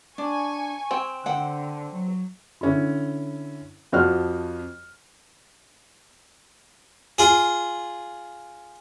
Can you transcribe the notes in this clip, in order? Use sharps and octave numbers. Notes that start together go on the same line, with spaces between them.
D4 G#5 C#6
C4 G5
D3 C5 F#5 G5
F#3
D3 C#4 E4
F2 F3 F#4 C5 F6
F4 G#4